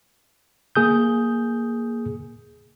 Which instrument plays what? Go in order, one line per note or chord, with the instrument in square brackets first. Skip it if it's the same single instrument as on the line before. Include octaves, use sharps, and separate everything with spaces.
[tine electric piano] A#3 G#4 D#6 G6